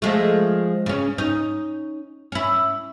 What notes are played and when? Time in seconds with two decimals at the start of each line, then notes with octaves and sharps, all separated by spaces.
0.02 F3 G#3 A3
0.86 C#3 C#4
1.18 C#4 D#4
2.32 C#4 E4